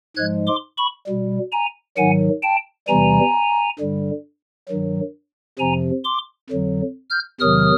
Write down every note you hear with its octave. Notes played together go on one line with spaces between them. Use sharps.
G#2 F3 G#3 F#6 G#6
C6 D6
B5 C#6
B2 G3
G#5 A#5
G#2 D#3 F#3 F#5 G#5
G5 A5
E2 C3 E3 G3 G#5 A#5
G2 D3 G3
G2 D#3 F#3
F2 C3 F3 G#5 A#5
C6 D6
F2 D3 F#3
F6 G6
E2 C3 D#3 F#3 D#6 F6